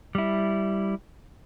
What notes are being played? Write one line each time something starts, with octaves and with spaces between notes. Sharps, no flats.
G3 E4